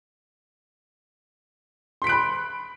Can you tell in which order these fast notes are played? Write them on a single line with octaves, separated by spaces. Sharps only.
C6 B6 D7 F#6 B5